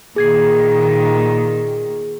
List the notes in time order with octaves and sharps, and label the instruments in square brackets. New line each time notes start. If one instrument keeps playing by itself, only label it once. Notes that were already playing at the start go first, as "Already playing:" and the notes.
[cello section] A#2 D#3 [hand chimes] G#4 G#6 C7